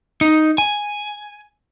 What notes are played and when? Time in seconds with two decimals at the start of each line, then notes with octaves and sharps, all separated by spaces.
0.21 D#4
0.58 G#5